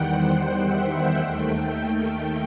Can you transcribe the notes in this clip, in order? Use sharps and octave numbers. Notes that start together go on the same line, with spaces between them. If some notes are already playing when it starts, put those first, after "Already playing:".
Already playing: E2 D#3 G3 F#5 G5
C5
E5
D#2 D#3 A3 G5